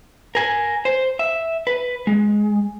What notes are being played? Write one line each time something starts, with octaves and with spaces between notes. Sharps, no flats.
A#4 G#5
C5
E5
B4
G#3